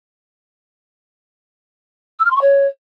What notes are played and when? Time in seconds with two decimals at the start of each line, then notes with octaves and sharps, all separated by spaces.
2.19 E6
2.24 F6
2.30 C6
2.36 C#6
2.41 C#5